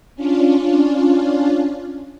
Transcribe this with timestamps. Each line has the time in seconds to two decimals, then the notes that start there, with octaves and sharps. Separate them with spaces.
0.16 C#4 D4 F4